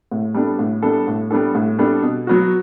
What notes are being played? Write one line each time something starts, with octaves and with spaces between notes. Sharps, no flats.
A2
G3 B3 D4 A4
A2
G3 B3 D4 A4
A2
G3 B3 D4 A4
A2
G3 B3 D4 A4
B2
F#3 B3 F#4